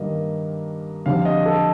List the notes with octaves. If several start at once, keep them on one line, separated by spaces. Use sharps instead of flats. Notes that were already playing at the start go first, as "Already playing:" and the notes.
Already playing: G2 D#3 A#3 D#5
F2 D3 G3 F5
F5
D#5
A4